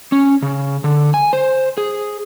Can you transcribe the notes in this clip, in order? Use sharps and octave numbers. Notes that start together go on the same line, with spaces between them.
C#4
C#3
D3
G#5
C5
G#4